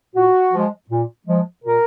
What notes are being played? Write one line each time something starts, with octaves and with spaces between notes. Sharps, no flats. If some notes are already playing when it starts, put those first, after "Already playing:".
A#2 F#4
F3 G#3
A#2
F3 G#3
A#2 A#4